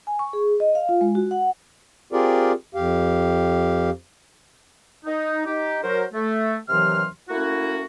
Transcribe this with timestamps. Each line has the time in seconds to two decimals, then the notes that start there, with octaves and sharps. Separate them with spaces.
0.07 G#5
0.19 C#6
0.33 G#4
0.60 D#5
0.75 F5
0.89 F4
1.01 G#3
1.15 F#4
1.31 F#5
2.13 C4 F4 G4 G#4 A#4 D5
2.75 F2 G4 F5
5.06 D#4
5.45 D#4 G4
5.84 F#3 A#4 C5
6.14 A3
6.69 D#2 C3 E3 F#3 C6 F6
7.30 A3 A#3 C#4 E4 F#4